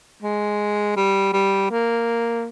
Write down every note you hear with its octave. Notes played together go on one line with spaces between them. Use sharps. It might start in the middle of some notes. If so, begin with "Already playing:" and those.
G#3
G3
G3
A#3